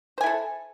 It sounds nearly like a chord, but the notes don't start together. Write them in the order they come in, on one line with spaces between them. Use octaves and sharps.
C5 G#5 E4 A4